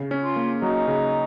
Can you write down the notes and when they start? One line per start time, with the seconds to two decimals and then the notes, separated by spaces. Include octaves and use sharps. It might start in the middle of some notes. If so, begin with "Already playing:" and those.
Already playing: C#3
0.11 C#4
0.24 F4
0.36 A#3
0.62 F#3 D#4
0.87 C#3